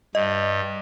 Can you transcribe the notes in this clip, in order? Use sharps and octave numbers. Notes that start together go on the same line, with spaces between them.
G2 D#5